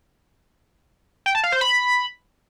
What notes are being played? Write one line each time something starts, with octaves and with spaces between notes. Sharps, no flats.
G5
A5
F5
C5
B5